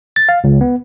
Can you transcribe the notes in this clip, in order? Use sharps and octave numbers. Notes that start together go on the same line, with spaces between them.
A6
F5
C#2
B3